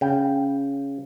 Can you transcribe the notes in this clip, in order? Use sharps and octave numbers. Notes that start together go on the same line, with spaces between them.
C#3 G5